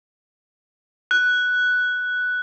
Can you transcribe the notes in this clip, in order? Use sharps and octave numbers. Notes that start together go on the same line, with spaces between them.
F#6